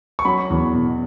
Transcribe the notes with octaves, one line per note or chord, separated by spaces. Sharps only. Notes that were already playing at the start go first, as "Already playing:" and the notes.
C#6
F#3 B5
E2
B2